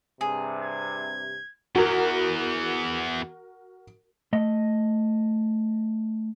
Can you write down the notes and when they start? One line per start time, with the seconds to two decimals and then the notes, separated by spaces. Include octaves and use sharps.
0.21 G2 C3 G#4
0.64 G#6
1.76 E2 E3 F#4 A#4
4.33 A3 D#5